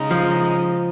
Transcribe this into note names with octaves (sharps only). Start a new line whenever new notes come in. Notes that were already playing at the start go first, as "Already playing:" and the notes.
Already playing: C#3 G#3 D#4
F3